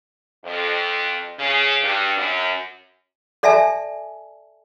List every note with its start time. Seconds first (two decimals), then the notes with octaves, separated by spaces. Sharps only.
0.44 F2
1.38 C#3
1.83 G2
2.17 F#2
3.43 A4 D5 E5 G#5 A5